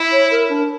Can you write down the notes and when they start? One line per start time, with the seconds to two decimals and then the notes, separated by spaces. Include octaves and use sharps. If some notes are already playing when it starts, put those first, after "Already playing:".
Already playing: E4
0.12 C#5
0.31 A#4
0.49 D4